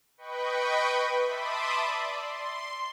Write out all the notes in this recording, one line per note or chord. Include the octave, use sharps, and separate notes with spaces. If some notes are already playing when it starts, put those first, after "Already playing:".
B4 D#5 G5 B5 C#6
E5 A5 B5 C6 D6 D#6
D5
C6